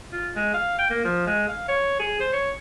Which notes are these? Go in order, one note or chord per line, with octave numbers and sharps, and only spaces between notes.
F4
G#3
F5
G5
A#3
F3
G#3
F5
C#5
G#4
C5
C#5